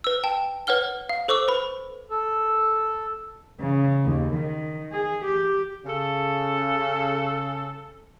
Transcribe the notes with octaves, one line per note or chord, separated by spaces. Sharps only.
B4 E6
G5 A5
B4 C#5 F#5 F6 G7
F5
A4 C5 C#6 D6 E6
B4 B5
A4
C#3
D#2
D#3
G#4
G4
C#3 A4